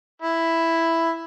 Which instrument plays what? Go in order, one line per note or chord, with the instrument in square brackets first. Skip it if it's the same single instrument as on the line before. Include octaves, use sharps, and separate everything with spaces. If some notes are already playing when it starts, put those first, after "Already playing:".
[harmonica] E4